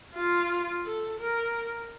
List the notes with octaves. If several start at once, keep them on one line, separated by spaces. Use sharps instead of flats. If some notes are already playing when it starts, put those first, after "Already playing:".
F4
A4
A#4